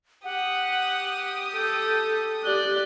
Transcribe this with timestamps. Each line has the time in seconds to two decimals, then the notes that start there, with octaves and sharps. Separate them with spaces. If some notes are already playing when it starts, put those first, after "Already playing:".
0.24 G4 F#5 D#6
1.55 A4 G6
2.45 G4 D5 F#6 G7